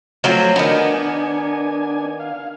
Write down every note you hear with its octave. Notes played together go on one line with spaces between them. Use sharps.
F3 F#3 A3 C4
D#3 B3 D4 G#5
F5